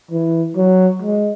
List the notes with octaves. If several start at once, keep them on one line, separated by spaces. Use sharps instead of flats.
E3
F#3
G#3